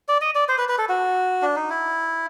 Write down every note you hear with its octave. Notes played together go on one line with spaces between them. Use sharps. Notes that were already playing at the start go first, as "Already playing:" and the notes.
D5
D#5
D5
C5
B4
B4
A4
F#4
D4
D#4
E4